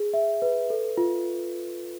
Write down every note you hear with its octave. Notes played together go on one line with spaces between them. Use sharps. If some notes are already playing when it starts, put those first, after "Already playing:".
Already playing: G#4
E5
B4
A4
F4